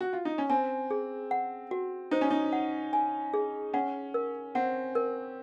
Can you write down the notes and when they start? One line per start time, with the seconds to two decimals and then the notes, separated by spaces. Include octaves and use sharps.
0.01 F#4
0.13 F4
0.25 D#4
0.38 C#4
0.50 C4 G#5
0.91 G#4
1.31 F#5
1.71 F#4
2.11 D#4 C5
2.21 C#4
2.31 D#4
2.53 F#5
2.93 G#5
3.34 G#4
3.74 C#4 F#5
4.14 A#4
4.55 C4 F#5
4.95 A#4